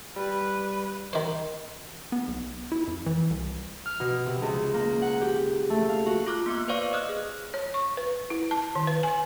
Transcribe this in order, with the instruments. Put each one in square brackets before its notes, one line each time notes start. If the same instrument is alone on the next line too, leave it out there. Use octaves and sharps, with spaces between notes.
[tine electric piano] G3 [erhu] B4
[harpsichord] D#3 C5
[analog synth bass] B3
B1
E4
F2
E3
C2
[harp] F6
B2
C3
C#2
A#3
F#5
G4
A3
F5
F#4
[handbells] F4 D6 F6 F#6
A#3 B3 D6
B4 C5 D5 F5 C#6
D#5 D#6 F6 F#6
G#4
[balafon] C#5
C#6
B4
E4
A5
D#3
B4
G#5